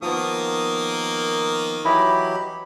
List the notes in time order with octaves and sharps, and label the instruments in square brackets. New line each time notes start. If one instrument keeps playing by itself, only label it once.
[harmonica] D#3 A#3 [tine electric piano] F3 B3 [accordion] D#6
[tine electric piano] E3 E4 D#5 [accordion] F#3 G4 [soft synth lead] B5